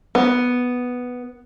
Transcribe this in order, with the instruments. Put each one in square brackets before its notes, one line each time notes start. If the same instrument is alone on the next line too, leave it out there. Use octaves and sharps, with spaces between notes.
[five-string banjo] B3